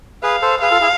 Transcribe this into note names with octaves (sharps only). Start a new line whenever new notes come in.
G#4 B4 F5
A4 C5
G#4 B4 F5
F4 A4
E4 G#4